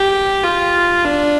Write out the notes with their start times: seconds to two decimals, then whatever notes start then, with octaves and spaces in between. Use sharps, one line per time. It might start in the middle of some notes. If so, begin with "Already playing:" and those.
Already playing: G4
0.43 F4
1.04 D4